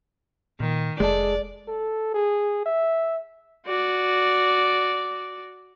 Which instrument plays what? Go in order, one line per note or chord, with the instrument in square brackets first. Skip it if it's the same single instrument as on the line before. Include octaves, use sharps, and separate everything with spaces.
[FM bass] A#2 [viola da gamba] D#3
[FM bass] F1 [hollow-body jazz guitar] G#3 A4 [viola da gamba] D5
[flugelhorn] A4
G#4
E5
[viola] F#4 D5